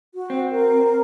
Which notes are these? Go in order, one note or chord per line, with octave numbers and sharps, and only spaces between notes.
F#4
C4
A#4